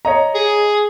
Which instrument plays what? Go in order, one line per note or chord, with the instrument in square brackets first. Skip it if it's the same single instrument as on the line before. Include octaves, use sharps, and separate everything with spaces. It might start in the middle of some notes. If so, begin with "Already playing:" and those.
[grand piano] C#5 D#5 A#5
[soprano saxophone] G#4